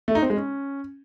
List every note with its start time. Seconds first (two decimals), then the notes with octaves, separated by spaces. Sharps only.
0.08 A3
0.15 D#4
0.22 C4
0.30 G#3
0.37 C#4